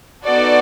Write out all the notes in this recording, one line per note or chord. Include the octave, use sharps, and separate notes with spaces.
B3 D#4 F#4 A4 D5